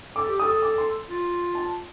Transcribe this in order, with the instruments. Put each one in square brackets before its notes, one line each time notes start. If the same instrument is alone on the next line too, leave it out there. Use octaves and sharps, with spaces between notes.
[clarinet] A4 [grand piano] D6
[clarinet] G4
[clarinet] A4 [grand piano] D#6
[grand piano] D6
C6
[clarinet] F4
[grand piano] A5